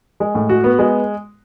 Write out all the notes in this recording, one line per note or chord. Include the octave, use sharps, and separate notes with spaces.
G#3
A2
F#4
B3
G#3